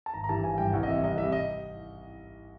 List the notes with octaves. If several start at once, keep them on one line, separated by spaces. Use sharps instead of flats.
A5
G#1 A#5
A#5
G2 E3 G3 A5
G#1 G#5
G2 E3 G3 G5
C2 F#5
D#5
C3 E3 G3 E5
C2 D#5
C3 E3 G3 E5
D#5